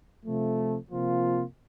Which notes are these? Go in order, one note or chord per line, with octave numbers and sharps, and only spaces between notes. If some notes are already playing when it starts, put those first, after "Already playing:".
C3 F3 A3
C3 F3 A#3 F4